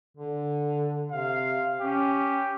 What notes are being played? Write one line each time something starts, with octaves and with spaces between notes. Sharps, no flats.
D3
C3 F5
C#4 G4